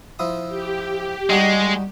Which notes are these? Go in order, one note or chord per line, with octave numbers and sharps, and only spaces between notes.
F3 E4 D#6
G4
G3 G#3 D#4 F#4